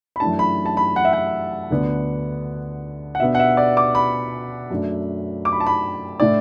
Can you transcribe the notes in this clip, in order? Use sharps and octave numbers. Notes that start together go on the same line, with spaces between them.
B5
F#2 E3 A3 D4 A5
B5
A5
B5
F#5
E5
F#5
D2 D3 B3 D4
F#5
B2 B3 D4 E5
F#5
E5
D5
D6
B5
F#2 F#3 A3 D4
D6
B5
A5
B5
A2 A3 D4 D5